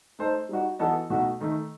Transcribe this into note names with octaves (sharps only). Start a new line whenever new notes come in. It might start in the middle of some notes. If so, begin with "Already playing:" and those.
A3 D#4 A4 C5 D#5
G3 D#4 F#4
E3 B3 F#4 A4 D#5
B2 A3 D#4 F#4
D#3 A3 D#4